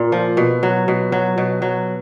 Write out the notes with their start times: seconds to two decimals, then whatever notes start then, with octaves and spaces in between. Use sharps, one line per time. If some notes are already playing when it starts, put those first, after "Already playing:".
Already playing: A#2
0.12 F3
0.37 B2
0.63 F#3
0.88 B2
1.12 F#3
1.38 B2
1.62 F#3